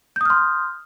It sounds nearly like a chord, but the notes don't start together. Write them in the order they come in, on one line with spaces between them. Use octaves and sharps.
G6 D#6 F6 C6